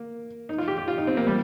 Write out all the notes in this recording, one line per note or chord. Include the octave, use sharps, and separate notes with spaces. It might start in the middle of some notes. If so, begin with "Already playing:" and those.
Already playing: A#3
D#4
F4
G4
G4
F4
D#4
C4
A#3
G3